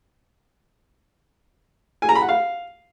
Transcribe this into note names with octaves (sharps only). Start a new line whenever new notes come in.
G#5
A#5
B5
F#5
F5